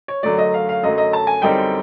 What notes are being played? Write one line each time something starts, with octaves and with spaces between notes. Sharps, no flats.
C#5
F#2 D3 F#3 A3 D5
D#5
F5
F5
F#2 D3 F#3 A3 D#5
D#5
A5
G#5
F#2 D3 G3 C4 D#4 G5